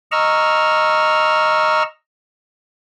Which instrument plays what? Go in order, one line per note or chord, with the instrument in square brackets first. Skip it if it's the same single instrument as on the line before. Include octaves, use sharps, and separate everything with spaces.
[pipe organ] D#5 A#5 C#6 E6 F6